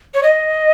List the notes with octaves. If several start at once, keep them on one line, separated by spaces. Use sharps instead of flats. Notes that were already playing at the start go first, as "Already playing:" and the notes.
C#5
D#5